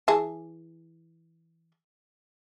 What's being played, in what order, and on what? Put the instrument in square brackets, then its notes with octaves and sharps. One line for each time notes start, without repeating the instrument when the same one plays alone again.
[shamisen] E3 G#4 A5